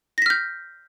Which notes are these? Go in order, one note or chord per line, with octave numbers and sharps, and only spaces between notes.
F6 G6 A#6 B6